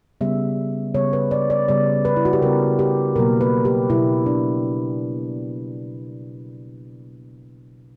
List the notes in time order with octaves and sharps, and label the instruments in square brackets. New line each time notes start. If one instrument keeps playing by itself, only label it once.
[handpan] C#3 G3 B3 E5
C#3 G3 B3 C#5
B4
D5
D5
C#3 G3 B3 D5
B4
E4
F#4
G4
C#3 G3 B3 A#4
G4
B2 F#3 A#3 A#4
B4
G4
B2 F#3 A#3 E4
D4